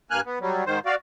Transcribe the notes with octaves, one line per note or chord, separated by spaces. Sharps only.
G2 A#3 G#5 F6 F#6
B3
F#3 G3
G#2 D#3 C5
F#4 D5 F5